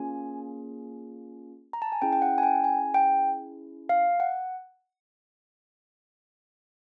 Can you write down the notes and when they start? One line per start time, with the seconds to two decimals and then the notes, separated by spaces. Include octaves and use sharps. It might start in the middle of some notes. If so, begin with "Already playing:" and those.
Already playing: A#3 C#4 F4 G#4 G#5
1.73 A#5
1.82 A5
1.92 G#5
2.02 C#4 E4 G#4 G5
2.13 G5
2.22 F#5
2.38 G#5
2.43 G5
2.64 G#5
2.94 G5
3.89 F5
4.20 F#5